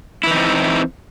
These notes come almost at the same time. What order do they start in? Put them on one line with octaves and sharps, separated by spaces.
E4 E3 D#4 C4